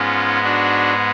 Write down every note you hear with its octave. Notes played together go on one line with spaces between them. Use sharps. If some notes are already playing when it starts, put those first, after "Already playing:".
Already playing: G#2 G#3 B3 C#4 F4
D4 F#4